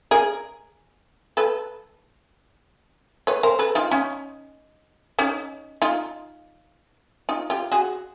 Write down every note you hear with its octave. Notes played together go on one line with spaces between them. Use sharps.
G#4 A#4
A4 B4
B4 C#5
A#4 C5
A4 B4
D#4 F4
C#4 D#4
C#4 D#4
D#4 F4
D#4 F4
F4 G4
F#4 G#4